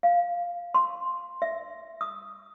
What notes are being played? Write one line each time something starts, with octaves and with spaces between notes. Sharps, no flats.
F5
C6
E5
D#6